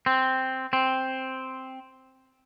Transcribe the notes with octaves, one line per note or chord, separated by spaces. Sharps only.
C4
C4